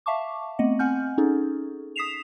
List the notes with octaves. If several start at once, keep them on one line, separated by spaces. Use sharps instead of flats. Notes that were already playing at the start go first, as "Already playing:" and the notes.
E5 F5 A5 C#6 D6
A3 B3 C4 D#5 F#5
C4 F#5 G#5 F6 G6
C#4 D#4 G#4 A4
D#6 B6 C7 E7 F7